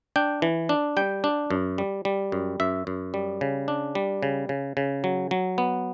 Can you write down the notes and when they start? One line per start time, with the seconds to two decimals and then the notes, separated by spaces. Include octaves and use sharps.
0.16 D4 G5
0.42 E3
0.69 D4
0.97 G3 G5
1.24 D4
1.51 F#2
1.78 G3
2.05 G3
2.32 F#2
2.60 F#2 E5
2.87 F#2
3.14 G3
3.41 C#3
3.68 D4
3.95 G3
4.23 C#3
4.49 C#3
4.77 C#3
5.04 F#3
5.31 F#3
5.58 B3